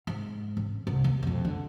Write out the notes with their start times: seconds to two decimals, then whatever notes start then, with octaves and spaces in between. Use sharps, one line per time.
0.07 G#2
0.57 A1
0.87 C2
1.04 D#2
1.23 F2 B2
1.45 D3